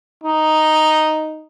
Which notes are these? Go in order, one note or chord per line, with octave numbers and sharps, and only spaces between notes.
D#4